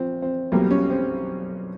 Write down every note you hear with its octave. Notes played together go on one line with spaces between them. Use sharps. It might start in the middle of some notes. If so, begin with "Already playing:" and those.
Already playing: A#1 F3 C4
C4
B1 B2 G3 A#3 C4
C#4
C4